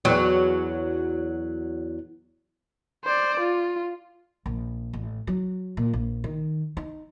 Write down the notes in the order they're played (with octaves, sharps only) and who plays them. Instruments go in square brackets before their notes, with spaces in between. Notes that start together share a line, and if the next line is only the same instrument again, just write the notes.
[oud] E2 F#3
[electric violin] C5 D5
F4
[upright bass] A#1
A1
F#3
A#2
A#1
D#3
D#4